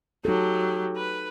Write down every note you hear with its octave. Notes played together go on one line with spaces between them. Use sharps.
F#3 D#4 G4 A4
B4